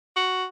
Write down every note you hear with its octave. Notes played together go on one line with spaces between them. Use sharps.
F#4